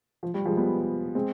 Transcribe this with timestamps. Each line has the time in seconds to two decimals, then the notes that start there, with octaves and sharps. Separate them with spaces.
0.23 F3
0.34 G3
0.45 F3 G#3
0.57 G3 B3
1.15 G#3 C4